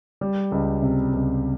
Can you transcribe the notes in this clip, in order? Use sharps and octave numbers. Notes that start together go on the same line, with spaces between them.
G3
C#2
C3
C#2